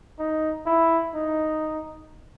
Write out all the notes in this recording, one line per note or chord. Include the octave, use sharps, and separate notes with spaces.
D#4
E4
D#4